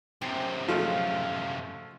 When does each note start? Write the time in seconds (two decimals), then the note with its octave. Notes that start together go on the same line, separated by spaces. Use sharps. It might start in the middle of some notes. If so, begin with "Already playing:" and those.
0.22 F#2 C3 C4
0.68 F3 G#3 A3 F5